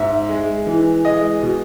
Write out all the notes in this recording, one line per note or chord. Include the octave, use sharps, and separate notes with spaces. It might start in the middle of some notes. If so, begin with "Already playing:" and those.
Already playing: G#2 E5
G#3
E3
G#3 D#5
B2